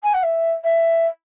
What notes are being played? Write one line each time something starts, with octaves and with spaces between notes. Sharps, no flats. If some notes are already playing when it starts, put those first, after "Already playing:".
G#5
F#5
E5
E5